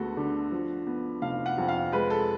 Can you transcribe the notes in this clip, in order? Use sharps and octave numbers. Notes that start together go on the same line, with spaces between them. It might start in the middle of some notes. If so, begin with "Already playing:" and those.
Already playing: D2 G#3 B3 F#4 A4
D3
F3
B3
F1 F5
F#5
F2
F5
G#3 B4
A4